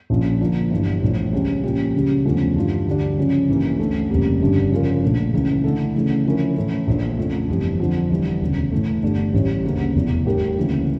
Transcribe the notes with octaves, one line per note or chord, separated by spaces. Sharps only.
A#1 A#2 F3 C#4 F4
D3 F3 A#3 D4
G1 G2 E3
A#1 A2 F3
C#2 C#3 G3 C#4
A#2 F3 C#4 G4
C#2 C#3 G3
E2 D3 F3 A3 C#4
G2 E3 G3 D4 F4
D2 D3 G3 D4
C#3 F3 C#4
A1 G2 E3 A#3 C#4
D2 D3 A3 C#4
F1 F2 C#3 G3 A#3
G1 G2 D3 G3 C#4
C#3 F3 C#4 F4 A#4
A#1 A#2 A3 D4
C#2 C#3 E3
D3 A3 E4 A4
C#3 E3 A3
D3 F3 C#4 E4 A#4
A2 E3 A3 C#4 E4
A#1 A2 F3 A#3 D4
F2 C#3 F3 A3
G1 F2 E3 G3
F2 D3 F3
G1 G2 E3 G3
E1 D2 C#3
A2 E3 A3
G1 G2 D3 A3 D4
A1 A2 E3 G3
D2 C#3 G3 A#3
F1 E2 E3
A2 G3 D4 G4 A#4
D2 C#3 E3 A#3